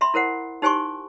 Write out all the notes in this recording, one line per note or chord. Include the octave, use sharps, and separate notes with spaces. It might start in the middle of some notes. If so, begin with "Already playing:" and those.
E5 B5 C6
E4 A#4 C5 F#5
D#4 G4 C5 G#5 C6 C#6